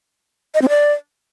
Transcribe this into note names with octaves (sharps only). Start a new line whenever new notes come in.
D#5
C4
D5